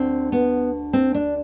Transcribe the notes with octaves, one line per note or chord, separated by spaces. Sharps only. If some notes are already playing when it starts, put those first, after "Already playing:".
Already playing: D2 D3 C4
B3
C4
D4